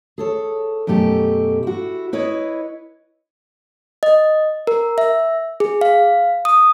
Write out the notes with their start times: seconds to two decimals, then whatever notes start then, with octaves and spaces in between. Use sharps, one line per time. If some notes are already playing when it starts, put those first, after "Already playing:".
0.18 G#4 A4 C#5
0.87 F#2 B2 A3 G4 A4
1.63 E4 F#4
2.13 E4 B4 C#5 D#5
4.03 D#5
4.67 A#4
4.98 E5
5.60 G#4
5.81 F5
6.45 D#6